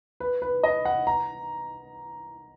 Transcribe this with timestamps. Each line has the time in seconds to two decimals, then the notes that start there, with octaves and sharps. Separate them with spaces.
0.20 B4
0.42 B4
0.63 D#5
0.85 F#5
1.07 A#5